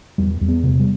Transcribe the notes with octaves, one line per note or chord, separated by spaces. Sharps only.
E2 G3
E2
B3
C3
G3